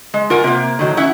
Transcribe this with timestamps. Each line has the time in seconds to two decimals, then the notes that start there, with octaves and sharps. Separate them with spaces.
0.14 G#3
0.30 F4 A#4 F#5 G#5
0.44 C3 A#3
0.79 A2 D#3 F#3
0.97 C#4 E4 F#5